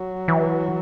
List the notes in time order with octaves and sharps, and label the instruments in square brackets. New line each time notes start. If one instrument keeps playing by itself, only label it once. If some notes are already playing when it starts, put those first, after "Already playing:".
Already playing: [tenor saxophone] F#3
[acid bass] E3